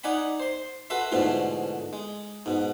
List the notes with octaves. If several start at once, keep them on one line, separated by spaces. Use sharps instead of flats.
D#4 D5 F#5 G#5 B5
C5 C6
F#4 A4 B4 E5 C6
G#2 B2 D3 E3 F3 A3
G#3
G#2 B2